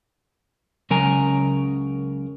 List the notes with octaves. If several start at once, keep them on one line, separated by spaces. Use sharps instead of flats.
C#2 C#3 F#3 A#4 G#5 A#5